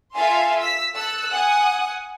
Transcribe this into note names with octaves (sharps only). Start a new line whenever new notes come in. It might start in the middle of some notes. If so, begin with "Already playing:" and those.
F4 A4 E5 F5 G#5 C6
E6 B6
A4 E6 F#6
F#5 G#5 D#6